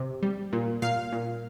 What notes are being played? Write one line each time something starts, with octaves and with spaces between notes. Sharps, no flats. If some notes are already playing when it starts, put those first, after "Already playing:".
Already playing: C3
G3
A#2
A#2 F5
A#2